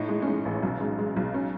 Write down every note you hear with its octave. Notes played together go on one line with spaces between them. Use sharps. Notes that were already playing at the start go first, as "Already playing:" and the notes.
Already playing: A2 D#4
G#3
C#4
G#3 D#4
A1
B1
G#3
G#3
B1
C#4